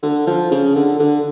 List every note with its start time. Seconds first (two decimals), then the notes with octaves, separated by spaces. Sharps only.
0.03 D3
0.27 F3
0.51 C#3
0.76 D3
1.00 D3